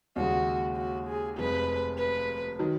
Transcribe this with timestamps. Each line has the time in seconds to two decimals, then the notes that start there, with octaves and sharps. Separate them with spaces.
0.16 D#2 C#3 G#3 F#4
0.77 F#4
1.08 G#4
1.38 F1 F2 F3 G#3 B4
1.98 B4
2.59 D#3 F#3